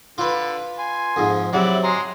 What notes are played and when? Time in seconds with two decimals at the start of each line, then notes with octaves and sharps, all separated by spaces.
0.18 D3 F4 B4
0.78 G#5 C6
1.16 F2 G#2
1.53 C3 F#3 E4 D5 F#5
1.83 G#3 A#5 C6